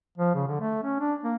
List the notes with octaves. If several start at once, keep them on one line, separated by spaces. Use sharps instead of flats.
F3
C#3
D3
A3
C#4
D4
A#3